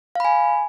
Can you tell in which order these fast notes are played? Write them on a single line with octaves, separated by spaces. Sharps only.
F5 B5 G#5